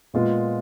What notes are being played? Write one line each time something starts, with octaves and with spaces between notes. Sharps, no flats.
A#2 G#3 B3 F4